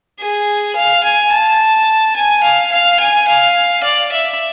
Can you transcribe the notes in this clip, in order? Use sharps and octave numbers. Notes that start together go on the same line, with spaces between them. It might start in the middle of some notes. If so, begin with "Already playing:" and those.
G#4
F5
G#5
A5
G#5
F5
F5
G#5
F5
D5
E5